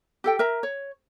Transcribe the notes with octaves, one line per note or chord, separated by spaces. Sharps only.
G4 A4 G5
A#4 E5 A#5
C#5